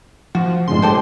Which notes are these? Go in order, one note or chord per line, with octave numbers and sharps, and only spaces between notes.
F3 F#4
A1 G#2 C#3 C6
G4 A4 C5